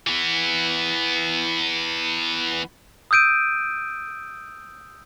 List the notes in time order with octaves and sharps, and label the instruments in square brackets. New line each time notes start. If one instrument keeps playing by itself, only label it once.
[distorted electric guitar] E3 B3
[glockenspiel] D#6 E6 G6 D7 D#7